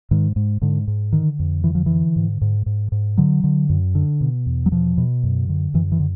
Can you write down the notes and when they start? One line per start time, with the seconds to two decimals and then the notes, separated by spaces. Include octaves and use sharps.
0.11 G#2 D#3
0.36 G#2
0.62 G#2 D3
0.87 G#2
1.13 D3 D#3
1.39 F2
1.64 D3 E3
1.75 F3
1.86 D3 E3
2.16 G#2
2.41 G#2
2.66 G#2
2.92 G#2
3.17 D3 F#3
3.44 D3
3.69 F#2
3.95 D3
4.21 B2
4.46 E2
4.66 F#3
4.72 B2 F3
4.98 B2
5.23 F#2
5.49 D3
5.74 F#2 E3
5.92 E3
6.00 D3